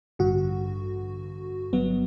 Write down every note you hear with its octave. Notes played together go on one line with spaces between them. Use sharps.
A1 G2 D3 F#4
G1 G2 F#3 B3